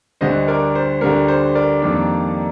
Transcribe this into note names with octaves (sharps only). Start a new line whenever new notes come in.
D2 D3 G3 C5 D#5
A#4 D5
C5
D2 D3 G3 A#4
C5
A#4 D5
F2 D#3 G3 A#3 D4